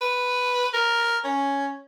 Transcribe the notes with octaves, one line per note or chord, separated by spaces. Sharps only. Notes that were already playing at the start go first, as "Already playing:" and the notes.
B4
A#4
C#4